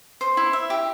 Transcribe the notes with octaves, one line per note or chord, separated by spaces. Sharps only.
C5
E4
E5
G4